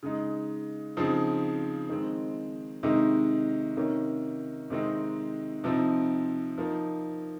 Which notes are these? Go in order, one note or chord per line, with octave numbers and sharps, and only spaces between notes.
C#3 G#3 D#4
C#3 F3 C4 D#4
D#3 G#3 C4
C3 D#3 G#3 D#4
C3 D#3 A#3 C#4
C3 D#3 G#3 C4 D#4
C3 F3 C4 D#4
F3 A#3 D#4